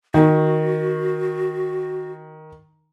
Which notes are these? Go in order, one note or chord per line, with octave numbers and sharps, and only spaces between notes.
D#3 F#4